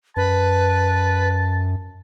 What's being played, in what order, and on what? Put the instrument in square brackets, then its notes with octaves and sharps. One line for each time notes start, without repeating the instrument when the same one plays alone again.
[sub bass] F#2 [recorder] B4 [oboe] A5